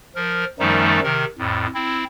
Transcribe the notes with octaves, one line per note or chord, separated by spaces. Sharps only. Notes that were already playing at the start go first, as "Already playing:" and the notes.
F3 A#4
F#2 D#3 F3 G3 A3 D#4
C3 D#3 A#4
F2 A2
C4 E4